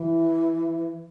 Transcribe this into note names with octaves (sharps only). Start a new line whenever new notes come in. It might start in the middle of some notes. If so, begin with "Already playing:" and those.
Already playing: E3